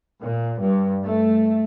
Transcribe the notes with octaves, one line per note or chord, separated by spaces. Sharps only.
A#2
G2
A3